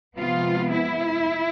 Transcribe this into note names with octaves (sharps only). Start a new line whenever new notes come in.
C3 F3 G#3 B3 F4
E4